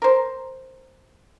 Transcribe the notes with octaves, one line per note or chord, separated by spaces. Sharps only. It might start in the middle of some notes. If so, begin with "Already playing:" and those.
A#4 C5